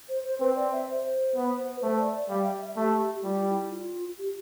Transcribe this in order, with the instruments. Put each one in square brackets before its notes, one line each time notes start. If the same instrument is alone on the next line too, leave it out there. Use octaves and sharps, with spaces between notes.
[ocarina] C5
C5
[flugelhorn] C4 [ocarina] B4
[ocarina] D5
E5
C5
[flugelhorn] B3
[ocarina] B4
[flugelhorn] A3 [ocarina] C5
[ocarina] D5
D5
[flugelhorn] G3 [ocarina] F5
[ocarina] E5
E5
[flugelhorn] A3 [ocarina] G4
[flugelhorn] G3 [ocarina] F4
[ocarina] E4
F4
G4